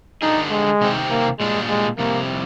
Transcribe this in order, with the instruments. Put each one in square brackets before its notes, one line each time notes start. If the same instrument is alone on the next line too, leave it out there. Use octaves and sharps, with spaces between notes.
[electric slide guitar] D3 G3 D4 G#4 [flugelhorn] D#4
[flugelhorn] G#3
[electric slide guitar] C3 D#3 G3 C4 G4
[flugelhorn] A#3
[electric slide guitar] A#2 G3 D4 G#4 [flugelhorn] G#3
[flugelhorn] G#3
[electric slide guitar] F2 C3 G3 [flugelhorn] A#3